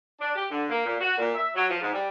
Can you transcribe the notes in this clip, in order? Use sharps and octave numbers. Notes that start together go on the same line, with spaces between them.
D4
G4
D3
A#3
A#2
F#4
A#2
E5
F#3
F3
G#2
G3